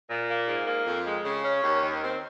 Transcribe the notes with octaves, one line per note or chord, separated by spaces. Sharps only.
A#2
A#3
G#2
A#3
F2
G#3
C#3
C#4
D#2
D#3
C4